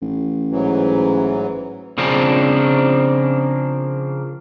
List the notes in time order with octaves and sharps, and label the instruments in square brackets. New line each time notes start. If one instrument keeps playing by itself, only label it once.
[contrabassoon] A1
[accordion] G#2 E3 F#3
[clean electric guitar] C#3 F3 A#3 C4 D4